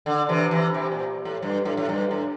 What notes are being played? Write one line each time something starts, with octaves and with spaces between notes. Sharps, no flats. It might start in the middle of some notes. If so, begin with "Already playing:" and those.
D3
C3 E3
C3 E3
C3
A#2
A2
G2
A2
A2
G2
A2